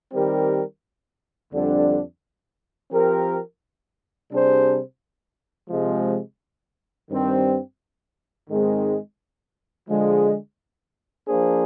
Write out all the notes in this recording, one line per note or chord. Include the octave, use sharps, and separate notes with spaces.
D#3 G3 C4 G4 A#4
F2 D3 G3 D4
F3 C4 G4 A#4
C3 G3 D4 G#4 C5
C3 F3 G#3
G2 D#3 G3 C4
G#2 D#3 G#3 C4
D3 F3 G#3
F3 A#3 D4 G#4 C5